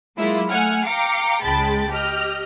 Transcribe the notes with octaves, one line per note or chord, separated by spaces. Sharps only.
F#3 G#3 A#3 E4 F4
A3 F#5 G#5 F6
F5 G5 A#5 D6 C#7
C#2 G#3 G5 A5 B5 A6
G4 D#5 F6